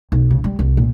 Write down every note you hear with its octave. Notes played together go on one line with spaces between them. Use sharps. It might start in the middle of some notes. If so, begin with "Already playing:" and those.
B1
C#3
G3
C2
A#2